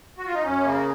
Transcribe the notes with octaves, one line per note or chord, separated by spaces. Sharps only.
F#4
F4
D#4
F#2 C#4
C#3 A#3